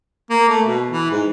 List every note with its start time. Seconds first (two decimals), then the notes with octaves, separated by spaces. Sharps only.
0.30 A#3
0.48 A3
0.66 B2
0.91 E3
1.11 G#2